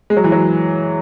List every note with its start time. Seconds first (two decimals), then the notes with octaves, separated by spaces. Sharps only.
0.10 G#3
0.17 F#3
0.24 E3
0.32 F#3